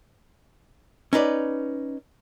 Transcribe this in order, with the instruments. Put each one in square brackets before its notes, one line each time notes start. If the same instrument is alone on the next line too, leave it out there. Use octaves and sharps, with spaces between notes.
[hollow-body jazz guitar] C#4 D#4 B4 D5